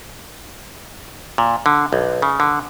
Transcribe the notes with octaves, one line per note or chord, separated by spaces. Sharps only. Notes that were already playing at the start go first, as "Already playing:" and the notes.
A#2
D3
B1
C#3
D3